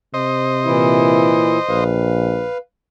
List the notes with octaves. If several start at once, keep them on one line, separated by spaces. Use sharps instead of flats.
C3 C5 D#5
A#2 E3 E4
A#1 B4 F5